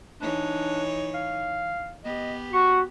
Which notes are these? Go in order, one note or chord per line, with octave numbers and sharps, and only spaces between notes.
E3 D4 D#4 C#5
F5
B3 G4 D#5
F#4 C#6